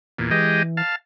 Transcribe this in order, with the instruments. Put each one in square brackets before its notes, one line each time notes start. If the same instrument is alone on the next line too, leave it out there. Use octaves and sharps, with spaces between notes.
[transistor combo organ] E2 A#2
[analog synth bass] E3 [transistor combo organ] G#3 G4 D#5
[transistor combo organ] F5 A5